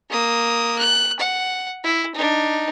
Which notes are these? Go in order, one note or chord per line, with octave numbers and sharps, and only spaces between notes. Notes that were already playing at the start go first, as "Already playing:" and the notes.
A#3 D#6
F#6
F#5
E4
D4 D#4